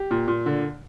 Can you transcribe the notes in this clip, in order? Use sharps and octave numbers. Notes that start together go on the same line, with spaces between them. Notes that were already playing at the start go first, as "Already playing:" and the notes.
Already playing: G4
A#2
A#2
D3